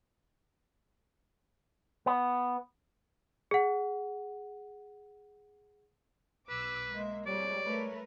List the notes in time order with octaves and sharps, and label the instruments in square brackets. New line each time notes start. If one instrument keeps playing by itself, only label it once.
[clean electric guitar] B3
[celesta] G#4 F#5
[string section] B1 D6 E6 [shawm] B4
[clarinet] G#3 [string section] A#3 E5
[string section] F2 G3 G#3 [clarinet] C#5 [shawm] D5
[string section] A3 A#4 B4